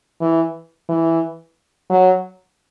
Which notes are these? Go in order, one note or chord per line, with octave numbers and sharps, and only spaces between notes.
E3
E3
F#3